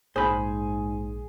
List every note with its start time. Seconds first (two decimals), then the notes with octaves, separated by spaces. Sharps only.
0.16 A#1 G#2 G#4 C5 B5